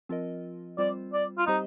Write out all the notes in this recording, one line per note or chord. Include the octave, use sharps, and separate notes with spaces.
F3 C4 F4 A#4 D#5
G3 C4 F4 C5 D5
D5
F4
G3 C4 D#4 G4 C5 D#5